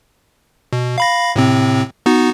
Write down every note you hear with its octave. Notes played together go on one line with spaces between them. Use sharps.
B2
F5 B5 A#6
A2 C3 C4
B3 D#4 F#4